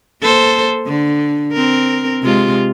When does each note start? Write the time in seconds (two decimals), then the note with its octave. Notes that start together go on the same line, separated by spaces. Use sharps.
0.22 A#3 A4 C5
0.86 D3
1.52 C4 A#4
2.23 C3 G#3 F4